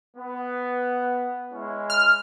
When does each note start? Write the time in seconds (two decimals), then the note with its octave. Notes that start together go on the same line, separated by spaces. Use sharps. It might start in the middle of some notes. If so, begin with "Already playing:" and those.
0.17 B3
1.53 G#3 C#4 E4
1.90 F6